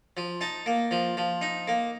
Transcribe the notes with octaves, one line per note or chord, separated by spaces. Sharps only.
F3
D#4 A5
A#3
F3
F3
D#4
A#3